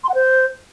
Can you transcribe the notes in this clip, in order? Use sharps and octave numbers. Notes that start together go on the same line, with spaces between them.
C6
F#5
C5